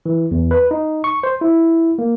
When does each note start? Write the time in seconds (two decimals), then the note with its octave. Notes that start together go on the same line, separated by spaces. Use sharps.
0.06 E3
0.31 E2
0.51 B4
0.71 D#4
1.04 C#6
1.23 C5
1.41 E4
1.99 A#3